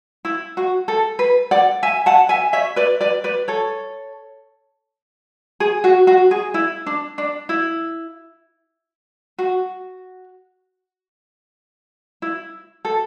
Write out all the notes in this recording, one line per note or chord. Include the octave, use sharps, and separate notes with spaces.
E4
F#4
A4
B4
D5 F#5
E5 G#5
F#5 A5
E5 G#5
C#5 E5
B4 D5
B4 D5
B4 D5
A4 C#5
G#4
F#4
F#4
G#4
E4
D4
D4
E4
F#4
E4
A4